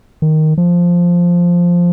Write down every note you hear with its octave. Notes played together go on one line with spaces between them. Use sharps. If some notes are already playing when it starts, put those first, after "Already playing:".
D#3
F3